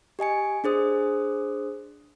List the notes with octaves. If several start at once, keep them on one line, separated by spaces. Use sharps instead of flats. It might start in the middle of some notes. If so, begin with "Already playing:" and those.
G4 D#5 G#5 C#7
D4 G#4 C5 D#6